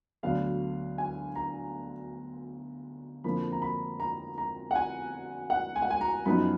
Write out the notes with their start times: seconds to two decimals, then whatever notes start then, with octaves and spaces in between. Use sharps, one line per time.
0.23 D2 D3 F#3 B3 D4 F5
0.98 G#5
1.36 A#5
3.24 F2 D3 F3 A#3 B5
3.52 A#5
3.62 B5
4.00 A#5
4.38 A#5
4.71 F#5
4.75 G#5
5.50 F#5
5.76 G#5
5.82 F#5
5.90 G#5
6.01 A#5
6.26 F#2 F3 B3 D#4 B5